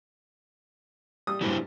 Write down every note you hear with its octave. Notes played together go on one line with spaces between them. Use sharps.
G3 D#6
G2 A#2 F#3 E4 C5